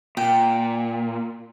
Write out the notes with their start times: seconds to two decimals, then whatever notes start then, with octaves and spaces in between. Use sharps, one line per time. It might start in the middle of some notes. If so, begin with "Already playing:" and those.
0.17 A#2 G5